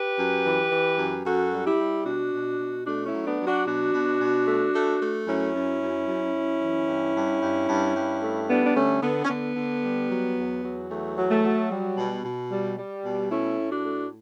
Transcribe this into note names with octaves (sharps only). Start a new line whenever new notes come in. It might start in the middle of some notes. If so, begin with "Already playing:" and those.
Already playing: G4 B4
F#2
E3
E3
F#2
F#2 F#4 A4
G3
E4 G4
G3
B2 D4 F#4
B2
B2
A3 D4 F#4
C#4 E4
F#3
B3 D4
F#3
D4 F#4
B2 D4 F#4
B2
B2
A3
A3
A3
F#2 C#4 E4
F#2
F#2
F#2
F#2
E3
G2
G2
G2
G2
G2
A3
G3 B3 D4
D4
D3 A3 C#4
D3 B3
C#4
D3 B3
D3
G3
F#3
E2
F#3
E2 A3
F#3
A3
F#3
G3
B2
B2
G3
G3
B2
A3 C#4 E4
A2
D4 F#4
A3